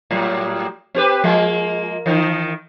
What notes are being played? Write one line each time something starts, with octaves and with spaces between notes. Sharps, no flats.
A2 F#3 G3
C4 G4 B4
F3 G#3 A#3
D#3 E3